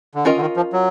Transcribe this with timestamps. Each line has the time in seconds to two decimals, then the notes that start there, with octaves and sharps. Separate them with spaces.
0.15 D3
0.25 D#3 C#4 F4 A#4 D#5
0.36 D3
0.41 D#3
0.57 F3
0.73 F#3